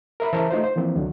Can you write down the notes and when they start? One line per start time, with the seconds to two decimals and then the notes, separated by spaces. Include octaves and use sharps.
0.20 A#4 E5 B5
0.33 C#3 E3 A#4 C5 E5 A5
0.51 A3 D#4 F4 C5
0.64 C5
0.76 E3 F3 A#3 C4
0.96 C#2 D3 F#3